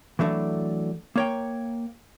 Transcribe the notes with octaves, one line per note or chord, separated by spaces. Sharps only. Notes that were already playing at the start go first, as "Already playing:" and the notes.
E3 F#3 A3 D4
A#3 C#5 G5